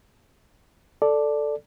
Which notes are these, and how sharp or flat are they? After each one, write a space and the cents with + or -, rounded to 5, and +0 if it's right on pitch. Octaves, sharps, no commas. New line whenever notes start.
A4 +0 D5 +0